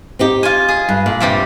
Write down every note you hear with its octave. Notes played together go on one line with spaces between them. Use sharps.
C4 D#4 G4
F4 G#5
G#4
G2
A#2
G2 C3 G3